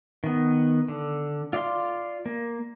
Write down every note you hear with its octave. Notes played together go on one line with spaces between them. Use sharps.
D#3 B3
D3
F4 D5 F5 C6
A#3